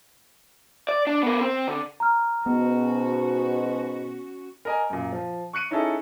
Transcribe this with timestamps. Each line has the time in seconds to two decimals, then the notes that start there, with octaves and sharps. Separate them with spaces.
0.89 D5
1.07 D4
1.23 B3 A#4
1.41 C4
1.67 D3
2.00 A#5 F6
2.46 G#2 B2 B3 C#4 F#4
4.65 A#4 D#5 G#5
4.90 F#2 A#2
5.13 F3
5.53 C#6 F#6 C#7 D#7
5.71 C#4 D#4 E4 G#4 A4 D#5